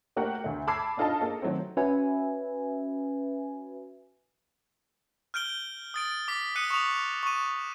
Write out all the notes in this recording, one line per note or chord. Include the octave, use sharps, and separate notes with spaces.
A3 A#3 F#4 G4 A#4 F#5
D2 A3
A5 B5 D6 E6 G#6 C7
D4 D#4 F4 A4 D#5 A5
A#3 G#4 A4 D#5
D#3 F#3 A3 C4
C#4 F#4 B4 E5 G#5
F6 G6 D7 G7
D#6 A6 D7
D6 B6
D#6 F#6 C#7 D#7
C#6 D#6 F7
C#6 D#7